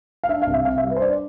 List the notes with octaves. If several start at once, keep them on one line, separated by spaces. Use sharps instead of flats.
F5
D4 E5
F5
C2
E5
C3 F5
E5
G3
B4
C5
D4 D5